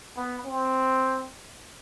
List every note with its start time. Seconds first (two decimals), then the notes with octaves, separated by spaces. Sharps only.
0.17 B3
0.45 C4